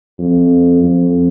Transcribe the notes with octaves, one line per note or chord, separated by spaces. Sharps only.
F2
F2